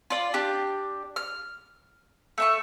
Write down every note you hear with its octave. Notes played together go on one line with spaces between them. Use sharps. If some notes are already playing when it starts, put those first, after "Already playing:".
F4 D5
D4 G4
F6
A3 E5 C#6